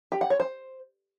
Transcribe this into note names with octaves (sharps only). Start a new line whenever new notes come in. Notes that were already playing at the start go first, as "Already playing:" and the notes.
G4
F#5
C#5
C5